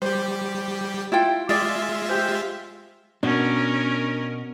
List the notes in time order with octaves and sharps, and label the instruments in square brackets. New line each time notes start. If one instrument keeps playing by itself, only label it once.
[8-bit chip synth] G3 G4 [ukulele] C5
[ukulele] E4 F4 G5
[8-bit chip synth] G#3 F4 E5 [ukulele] G#4 D5
[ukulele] G4 C5
[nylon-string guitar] B2 [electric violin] C#4 A#4 [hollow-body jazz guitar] D4